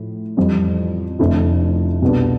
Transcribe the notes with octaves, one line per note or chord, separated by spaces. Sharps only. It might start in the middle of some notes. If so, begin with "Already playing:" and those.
Already playing: A2 F3
F2 E3 G3
F1 F2 D3 A3 E4
C2 B2 B3 D4